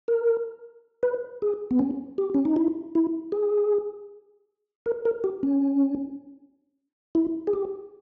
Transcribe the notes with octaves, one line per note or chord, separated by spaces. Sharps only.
A#4
B4
G#4
B3
C#4
G4
C#4
D#4
E4
E4
G#4
A#4
A#4
G4
C#4
E4
G#4
G4